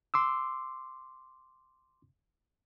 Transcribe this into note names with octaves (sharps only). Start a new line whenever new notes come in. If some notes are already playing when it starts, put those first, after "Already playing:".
C6 D6 E6